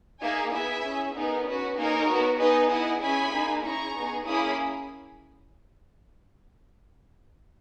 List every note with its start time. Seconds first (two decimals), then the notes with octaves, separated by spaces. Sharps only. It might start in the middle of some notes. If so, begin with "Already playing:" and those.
0.21 A#3 D#4 G#4 E5 G#5
0.52 B3 E4 G#4 E5 G#5
0.83 C#4 G#4
1.14 B3 D#4 G#4 A#4
1.46 C#4 F#4 B4
1.77 A#3 D#4 G#4 A#4 C#5
2.08 B3 F#4
2.39 B3 D#4 G#4 B4 D#5
2.71 B3 E4 G#4 D#5 F#5
3.02 C#4 E4 G#4 G#5 B5
3.33 A#3 D#4 G#4
3.64 C#4 E4 G#4 A#5 C#6
3.96 B3 D#4 G#4
4.26 A#3 C#4 E4 G#4 B5 D#6